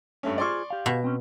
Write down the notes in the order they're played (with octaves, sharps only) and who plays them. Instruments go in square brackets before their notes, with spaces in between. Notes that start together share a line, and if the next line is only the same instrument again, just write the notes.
[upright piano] G2 A3 C#4
[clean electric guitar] F4 G#4 C5 [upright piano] D5 C6 C#6
[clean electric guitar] G4 F5
[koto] B2
[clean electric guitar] C4 C#4